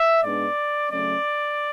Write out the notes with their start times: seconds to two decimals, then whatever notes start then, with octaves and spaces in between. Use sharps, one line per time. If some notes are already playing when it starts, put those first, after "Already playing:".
Already playing: E5
0.22 G#2 G#3 B3 D4 D5
0.90 C#3 F#3 A3 C#4 D5